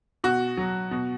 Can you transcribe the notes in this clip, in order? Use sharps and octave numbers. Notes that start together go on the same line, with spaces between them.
B2 F#4
F#3
B2